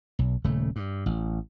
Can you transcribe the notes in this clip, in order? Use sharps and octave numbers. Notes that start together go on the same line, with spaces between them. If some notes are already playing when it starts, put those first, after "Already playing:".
B1
D#1 C#3 A3
G2
A1